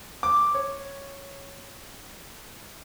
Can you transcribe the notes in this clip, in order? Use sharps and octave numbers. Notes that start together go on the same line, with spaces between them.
D6
C#5